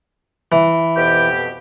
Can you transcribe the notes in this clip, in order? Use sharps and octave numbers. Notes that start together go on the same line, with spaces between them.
E3
F2 B2 G4